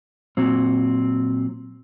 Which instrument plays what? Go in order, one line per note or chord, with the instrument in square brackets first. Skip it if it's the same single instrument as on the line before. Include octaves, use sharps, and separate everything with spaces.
[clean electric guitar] A#2 F#3 C4